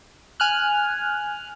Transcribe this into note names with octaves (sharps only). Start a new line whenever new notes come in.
G#5 F6 F#6